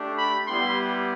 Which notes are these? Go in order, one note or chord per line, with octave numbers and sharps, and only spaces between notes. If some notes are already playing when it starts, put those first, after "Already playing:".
Already playing: A3 D4 G4
B5
G3 B3 E4 G4 C6